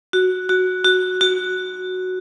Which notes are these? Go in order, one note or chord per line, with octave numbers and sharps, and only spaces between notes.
F#4
F#4
F#4
F#4